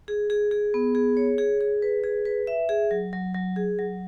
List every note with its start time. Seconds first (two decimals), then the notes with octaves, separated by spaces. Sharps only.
0.08 G#4
0.30 G#4
0.51 G#4
0.74 B3
0.95 G#4
1.17 C#5
1.38 G#4
1.60 G#4
1.82 B4
2.04 G#4
2.25 B4
2.47 E5
2.69 G#4
2.91 F#3
3.13 F#3
3.34 F#3
3.56 G#4
3.79 F#3